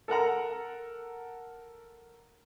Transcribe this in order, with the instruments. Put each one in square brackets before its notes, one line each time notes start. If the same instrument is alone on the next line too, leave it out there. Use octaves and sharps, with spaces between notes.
[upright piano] A4 A#4 F#5 A#5